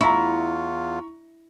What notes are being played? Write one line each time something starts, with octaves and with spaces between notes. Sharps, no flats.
E2 E4 F4 A#5 C#6